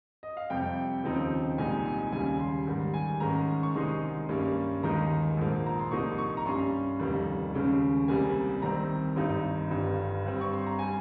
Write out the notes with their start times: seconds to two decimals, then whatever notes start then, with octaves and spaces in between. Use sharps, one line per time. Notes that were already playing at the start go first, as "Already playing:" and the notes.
0.23 D#5
0.37 F5
0.50 F2 C3 G3 G5
1.04 D#2 C#3 F3 C4 D#4
1.58 C2 A#2 G#3 D#4 G#5
1.85 G#5
2.12 D#2 C#3 G3 G#5
2.40 C6
2.67 G#2 D#3 G3
2.94 G#5
3.20 G#2 D#3 G#3 C#4 A#5
3.63 C#6
3.75 C2 C3 D#3 G#3 D#4 C6
4.29 G2 G3 A#3 C#4
4.83 D#2 D#3 G#3 D#4 A#5
5.37 A#1 G#2 F3 A#3
5.66 A#5
5.79 C6
5.91 C2 C3 F3 A#3 D#4 C#6
6.18 C#6
6.37 A#5
6.45 G2 G3 C#4 C6
7.00 F1 D#2 D#3 G3
7.54 D#2 C#3 G#3 C#4
8.08 C2 C3 G3 A#3 G#5
8.62 C2 C3 D#3 G3 C4 A#5
9.16 G#1 G2 G3 C4 D#4
9.71 G1 G2 G3
10.25 G2 G3 C4
10.41 C#6
10.54 C6
10.67 A#5
10.79 G3 G#5